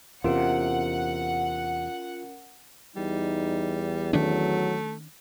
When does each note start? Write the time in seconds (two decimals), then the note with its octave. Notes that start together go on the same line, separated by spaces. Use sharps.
0.24 E2 C3 C#4 F4 A#4 F#5 D7
2.96 E2 G3 D#4
4.13 D#3 F#3 A3 C#4 D4